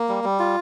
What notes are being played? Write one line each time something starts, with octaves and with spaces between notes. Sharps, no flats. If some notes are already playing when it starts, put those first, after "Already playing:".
Already playing: A#3
G3
G3
F4